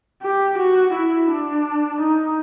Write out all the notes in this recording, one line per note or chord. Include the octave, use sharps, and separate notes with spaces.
G4
F#4
E4
D4
D#4